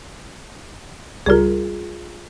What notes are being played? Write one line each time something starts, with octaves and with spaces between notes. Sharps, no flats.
C#2 G3 F4 G#4 A#4